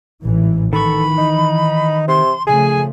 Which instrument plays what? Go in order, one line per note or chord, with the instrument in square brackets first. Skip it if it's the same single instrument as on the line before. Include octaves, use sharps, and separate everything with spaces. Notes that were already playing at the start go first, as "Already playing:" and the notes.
[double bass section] A1 G#2 E3
[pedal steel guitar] D#3 C#6 [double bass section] E3 [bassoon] A4 [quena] B5
[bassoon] D#4
[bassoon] C3 [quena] C6
[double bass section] C#3 F3 A3 [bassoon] G#4 [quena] G#5